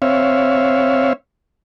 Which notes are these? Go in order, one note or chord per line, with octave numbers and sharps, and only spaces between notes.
C4 C#5 E5 F5